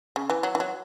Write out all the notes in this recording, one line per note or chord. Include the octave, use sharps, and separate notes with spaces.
C#3
E3
F#3
E3
F#3